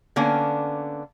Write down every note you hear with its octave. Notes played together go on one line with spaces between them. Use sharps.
D3 A#3 B3 C#4 D4